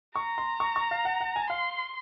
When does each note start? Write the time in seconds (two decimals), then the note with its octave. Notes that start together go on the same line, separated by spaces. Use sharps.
0.16 A#5 C#6
0.38 C6
0.60 C#6
0.76 C#6
0.91 F5
1.05 F#5
1.20 F#5
1.36 G#5
1.50 F5 C6